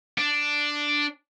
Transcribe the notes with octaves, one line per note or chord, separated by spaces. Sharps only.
D4